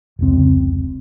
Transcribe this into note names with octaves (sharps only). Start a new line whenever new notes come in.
F1 C#2 C4